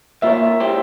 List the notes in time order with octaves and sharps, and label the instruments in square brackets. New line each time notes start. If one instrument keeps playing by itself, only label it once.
[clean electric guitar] A#3 F4 A#4 C#5 [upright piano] E5
[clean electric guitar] G#3 E4 G4 C5